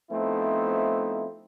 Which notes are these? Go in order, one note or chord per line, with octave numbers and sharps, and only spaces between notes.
F3 A3 B3 C4 D#4 E4